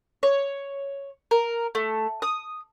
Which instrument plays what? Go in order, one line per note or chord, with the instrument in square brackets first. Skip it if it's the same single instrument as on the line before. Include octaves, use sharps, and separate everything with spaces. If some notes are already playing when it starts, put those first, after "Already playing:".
[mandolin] C#5
A#4
A3
D#6